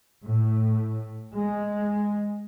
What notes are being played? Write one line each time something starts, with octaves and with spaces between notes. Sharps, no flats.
A2
G#3